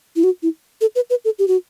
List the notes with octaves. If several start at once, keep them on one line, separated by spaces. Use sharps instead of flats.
E4
F#4
E4
A4
B4
B4
A4
G4
F#4